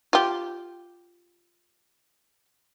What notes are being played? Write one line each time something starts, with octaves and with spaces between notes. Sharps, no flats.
F4 G4